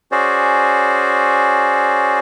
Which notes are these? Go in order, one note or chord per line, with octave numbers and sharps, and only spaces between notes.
C#4 F#4 G#4 C5 D5